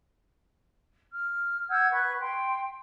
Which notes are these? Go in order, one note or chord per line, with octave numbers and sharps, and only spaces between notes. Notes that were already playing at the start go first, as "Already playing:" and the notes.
F6
F#5 E6 G6 G#6
B4 C#6 F#6
G5 C6